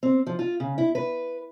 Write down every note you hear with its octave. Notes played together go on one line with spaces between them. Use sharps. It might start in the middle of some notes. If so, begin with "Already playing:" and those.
C4
F3
F4
C#3
E4
B4